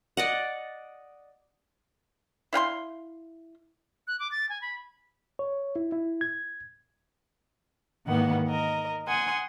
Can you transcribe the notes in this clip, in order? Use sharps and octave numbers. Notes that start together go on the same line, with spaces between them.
D5 D#5 F#5
E4 F5 G5 C6
F#6
D6
A6
G#5
B5
C#5
E4
E4
G#6
E2 G#2 D#3 A#3 B3 F#5
A#4 D#5
F#5 G#5 C6 D#6